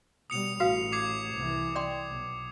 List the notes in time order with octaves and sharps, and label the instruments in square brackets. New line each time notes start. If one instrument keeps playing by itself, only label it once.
[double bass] B2 G3 [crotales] D#6 C#7 F7
[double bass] A1 [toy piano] F#4 B4 F5 [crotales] C7
[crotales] D6 G#6 C7
[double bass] C2 E3
[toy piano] D5 G5 C6
[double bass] B1